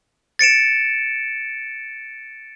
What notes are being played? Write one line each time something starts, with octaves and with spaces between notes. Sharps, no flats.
A6 C#7 D7 E7